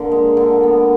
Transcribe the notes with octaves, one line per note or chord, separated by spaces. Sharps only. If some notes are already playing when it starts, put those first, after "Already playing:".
Already playing: D3 A#3
G#3
D3
B3